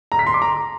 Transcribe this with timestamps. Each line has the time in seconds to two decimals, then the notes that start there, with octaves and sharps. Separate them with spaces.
0.12 A#5
0.19 B6
0.27 C6
0.34 D6
0.42 A#5